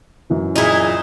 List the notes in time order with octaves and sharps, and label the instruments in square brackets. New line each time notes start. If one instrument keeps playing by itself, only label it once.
[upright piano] F#2 E3
[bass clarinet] A#2 [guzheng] D#4 E4 [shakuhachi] G#4